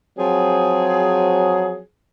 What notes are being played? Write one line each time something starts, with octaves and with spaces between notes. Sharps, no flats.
F3 F#3 C4 G#4